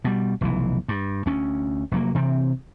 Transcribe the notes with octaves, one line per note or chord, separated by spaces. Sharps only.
B2 G3
F1 B1 E3
G2
D2 C#4
F1 F#3 A#3
C3 E3 C4